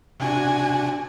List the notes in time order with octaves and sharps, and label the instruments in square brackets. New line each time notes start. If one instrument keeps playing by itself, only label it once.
[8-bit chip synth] C3 D4 F#4 [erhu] G#5